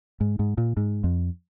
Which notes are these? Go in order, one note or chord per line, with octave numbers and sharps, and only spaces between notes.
G#2
G#2
A#2
G#2
F2